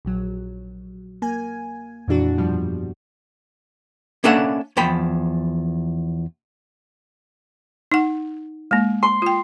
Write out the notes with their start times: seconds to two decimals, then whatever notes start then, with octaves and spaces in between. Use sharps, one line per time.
0.05 A#1 F#3
1.22 A#3 G#5
2.08 F2 A#2 E3 D4 F#4
2.38 G2 B2 F3 G3
4.24 A#3 C#4 D4 A4 E5 F#5
4.77 E2 F3 G5 B5
7.92 D#4 F#5
8.71 G#3 A#3
9.03 C6
9.22 F4 G5